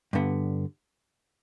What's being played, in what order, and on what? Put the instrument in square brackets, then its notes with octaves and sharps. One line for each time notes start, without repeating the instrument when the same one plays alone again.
[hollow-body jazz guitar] G2 D3 B3